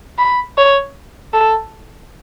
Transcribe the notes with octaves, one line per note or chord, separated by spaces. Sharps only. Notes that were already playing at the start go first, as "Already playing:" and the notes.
B5
C#5
A4